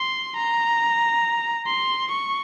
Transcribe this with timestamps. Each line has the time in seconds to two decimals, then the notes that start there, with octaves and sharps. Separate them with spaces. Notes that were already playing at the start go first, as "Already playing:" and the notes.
Already playing: C6
0.37 A#5
1.67 C6
2.10 C#6